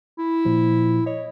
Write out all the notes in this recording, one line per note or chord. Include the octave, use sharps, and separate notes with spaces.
E4
A#2 F3
C#5 D#5